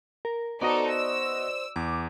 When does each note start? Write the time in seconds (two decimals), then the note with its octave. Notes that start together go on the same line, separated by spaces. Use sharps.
0.25 A#4
0.61 B3 D#4 F#4 A4 C5 D5 D#5
0.92 E6
1.76 E2 D6